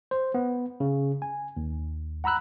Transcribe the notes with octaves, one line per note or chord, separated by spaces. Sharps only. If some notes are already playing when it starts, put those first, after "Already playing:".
C5
B3
C#3
G#5
D#2
F#5 A#5 B5 E6 F#6